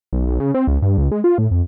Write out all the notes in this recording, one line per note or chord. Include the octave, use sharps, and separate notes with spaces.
B1
B1
C#3
C4
C#2
G2
C#2
G#3
F4
A2
F2